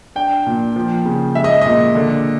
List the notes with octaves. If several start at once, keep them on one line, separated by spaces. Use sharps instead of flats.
D4 G5
A#2
F3
C#3
G#3 E5
D#5
A#2 D#5
D3